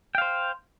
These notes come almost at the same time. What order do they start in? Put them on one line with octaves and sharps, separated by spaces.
G5 F5 C5